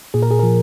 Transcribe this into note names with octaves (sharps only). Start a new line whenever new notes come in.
A#2 G#4
A#4
G#4
A#4
F3